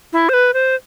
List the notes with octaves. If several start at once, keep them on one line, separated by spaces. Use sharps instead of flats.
E4
C5
B4
C5